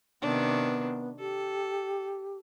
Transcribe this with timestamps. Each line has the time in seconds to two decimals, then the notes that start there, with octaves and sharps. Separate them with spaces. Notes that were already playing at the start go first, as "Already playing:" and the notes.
0.22 C3 D#3 B3 D4
1.19 G4 A4